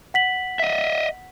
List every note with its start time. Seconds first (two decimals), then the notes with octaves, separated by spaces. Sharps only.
0.14 F#5 B6 F#7
0.59 D#5 E5